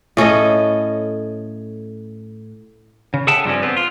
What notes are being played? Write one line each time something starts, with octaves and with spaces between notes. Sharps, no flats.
A2 C#4 A4 D#5
C#3
G#4 A4 E5 F#5 G5 A5
G2 F3 G3 A#3 C4 C#4
B3 C4
F4